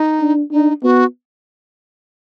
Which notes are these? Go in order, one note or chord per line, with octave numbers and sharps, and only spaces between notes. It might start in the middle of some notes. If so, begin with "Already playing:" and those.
Already playing: D#4
D4
D4 D#4
B3 F#4